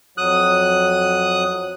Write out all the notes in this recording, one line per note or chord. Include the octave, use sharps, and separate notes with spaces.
F2 F#3 D#6 F#6